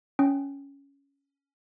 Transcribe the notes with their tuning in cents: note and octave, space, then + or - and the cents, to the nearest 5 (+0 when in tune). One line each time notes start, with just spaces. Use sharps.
C#4 +10 G5 +0